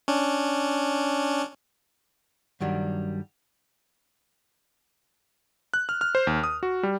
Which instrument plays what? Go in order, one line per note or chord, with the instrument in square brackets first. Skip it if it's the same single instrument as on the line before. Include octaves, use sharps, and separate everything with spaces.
[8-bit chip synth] C#4 D4
[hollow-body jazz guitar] G2 D#3 F#3 G3 D4
[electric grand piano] F#6
F6
F6
C5
D#2
D#6
F#4
G3